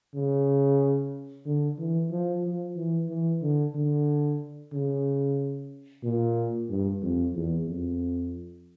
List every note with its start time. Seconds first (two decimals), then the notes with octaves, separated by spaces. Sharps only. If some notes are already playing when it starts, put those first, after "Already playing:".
0.15 C#3
1.45 D3
1.78 E3
2.11 F3
2.44 F3
2.76 E3
3.09 E3
3.42 D3
3.75 D3
4.73 C#3
6.04 A#2
6.69 G2
7.02 F2
7.35 E2
7.68 F2